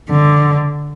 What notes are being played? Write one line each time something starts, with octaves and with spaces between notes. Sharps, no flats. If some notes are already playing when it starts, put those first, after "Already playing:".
D3